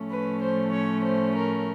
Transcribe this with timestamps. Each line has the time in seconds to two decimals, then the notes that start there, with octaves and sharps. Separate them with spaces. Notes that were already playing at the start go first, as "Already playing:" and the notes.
Already playing: A2 F3 A3 C#4
0.10 B4
0.42 C5
0.73 C#5
1.05 C5
1.35 A#4